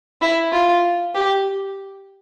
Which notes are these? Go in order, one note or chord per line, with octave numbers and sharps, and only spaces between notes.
E4
F4
G4